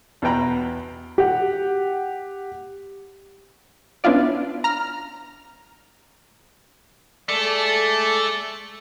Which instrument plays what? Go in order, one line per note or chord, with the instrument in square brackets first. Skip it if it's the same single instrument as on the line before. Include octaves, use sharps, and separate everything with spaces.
[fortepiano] E2 B2 B4 G5 A#5 B5
[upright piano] G4 F#5
[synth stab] B3 C#4 D4 E4 F4 D5
A#5 F6
[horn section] G#3 A4 D5 [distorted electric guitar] A3